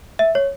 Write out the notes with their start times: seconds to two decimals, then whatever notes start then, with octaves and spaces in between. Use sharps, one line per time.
0.19 E5
0.35 C#5